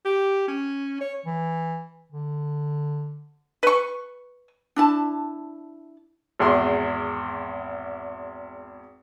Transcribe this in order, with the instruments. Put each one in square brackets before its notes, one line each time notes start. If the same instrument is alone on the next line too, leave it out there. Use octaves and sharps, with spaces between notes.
[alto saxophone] G4
C#4
C#5
[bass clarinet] E3
D3
[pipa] B4 C#6
[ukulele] D4 E4 A5
[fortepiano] G#1 E2 G#4 C6